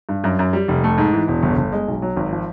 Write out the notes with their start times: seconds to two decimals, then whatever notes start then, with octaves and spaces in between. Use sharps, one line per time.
0.09 G2
0.24 F#2
0.39 F#2
0.53 G3
0.68 F1
0.84 A3
0.98 G#2
1.13 E3
1.28 E1
1.43 G1
1.57 G1
1.72 G#3
1.88 B1
2.02 F#3
2.16 G#1
2.33 F3